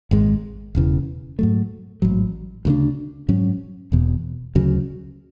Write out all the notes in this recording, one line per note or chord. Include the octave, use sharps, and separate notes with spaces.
G#1 G#2 G#3
E1 E2 C#3 E3
G#2 F#3 A3
A1 G#2 F#3
D2 C#3 G#3 D4
G#2 F#3 C#4
E1 E2 B2
D2 C#3 F#3